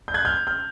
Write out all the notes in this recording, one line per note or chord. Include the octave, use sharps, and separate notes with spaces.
G6
F#6 G#6
F6 G6
F6 G6